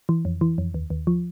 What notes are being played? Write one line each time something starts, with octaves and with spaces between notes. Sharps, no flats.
E3
F2
E3
F2
D#2
D#2
F3